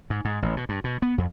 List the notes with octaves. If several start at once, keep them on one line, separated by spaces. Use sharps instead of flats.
G#2
G#2
A1
B2
G2
B2
B3
F2